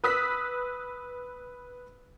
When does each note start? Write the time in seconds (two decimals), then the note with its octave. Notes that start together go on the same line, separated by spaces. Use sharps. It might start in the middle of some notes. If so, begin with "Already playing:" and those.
0.04 B4 D#6 E6 F#6 B6